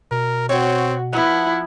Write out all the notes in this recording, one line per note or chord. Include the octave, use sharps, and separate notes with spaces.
B2 A#4
C4 F#4 C#5 G5
F3 B3 E4 F#5